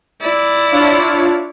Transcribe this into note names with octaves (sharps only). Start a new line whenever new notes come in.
E4 D5
D4 F4 C#5